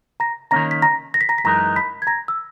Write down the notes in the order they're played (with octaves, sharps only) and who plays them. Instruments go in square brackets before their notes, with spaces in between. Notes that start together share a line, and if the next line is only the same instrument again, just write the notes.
[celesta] A#5 A#6
[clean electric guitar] D#3 A#3 C#4 [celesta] A#5 A#6
[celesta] B6
A#5 A#6
A#6
B6
A#5 A#6
B6
[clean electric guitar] F#2 E3 G#3 D#4 A#4 [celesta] A#5 A#6
[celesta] B5 B6
G#6
A#5 A#6
E6